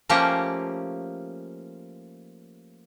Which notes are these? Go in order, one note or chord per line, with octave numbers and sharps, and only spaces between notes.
F3 A3 A#3 C#4 G4